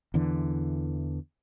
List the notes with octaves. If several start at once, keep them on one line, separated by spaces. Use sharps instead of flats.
E2 D3 E3